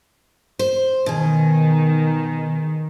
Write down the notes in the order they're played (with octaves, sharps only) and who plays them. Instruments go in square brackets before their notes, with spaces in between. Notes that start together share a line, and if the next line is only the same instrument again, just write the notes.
[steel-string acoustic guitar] C5
[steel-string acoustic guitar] B2 G#4 [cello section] D#3